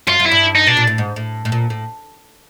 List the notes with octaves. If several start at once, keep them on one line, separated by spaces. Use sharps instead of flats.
F#2 F4
F#2
E4
G2
D#4
B2 D4
A#2
A2
G#2
A2
A2
A#2
A2